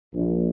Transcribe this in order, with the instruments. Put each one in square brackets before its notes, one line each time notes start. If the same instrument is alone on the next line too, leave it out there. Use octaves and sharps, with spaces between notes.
[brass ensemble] A#1